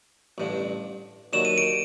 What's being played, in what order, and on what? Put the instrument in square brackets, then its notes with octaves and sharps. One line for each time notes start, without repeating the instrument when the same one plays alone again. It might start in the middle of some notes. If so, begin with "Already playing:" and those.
[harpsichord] A1 G2 D3
[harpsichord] D#2 D3 F#3 [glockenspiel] E7
[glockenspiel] D#7
D7